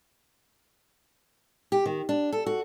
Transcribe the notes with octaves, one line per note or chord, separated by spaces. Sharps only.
G4
D#3
D4
A4
F#4